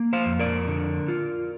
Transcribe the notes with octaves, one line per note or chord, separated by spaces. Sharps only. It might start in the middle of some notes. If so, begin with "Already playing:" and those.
Already playing: A#3
C5 F5
F2
A#4 D5
D3
F4